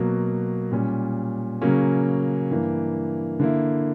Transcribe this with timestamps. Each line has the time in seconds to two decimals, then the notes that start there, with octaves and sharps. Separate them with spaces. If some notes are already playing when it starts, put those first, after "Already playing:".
Already playing: B2 F#3 A#3
0.72 A#2 G3 C#4
1.61 C#3 F#3 A#3 C#4
2.50 G2 E3 A#3
3.40 D3 A#3 E4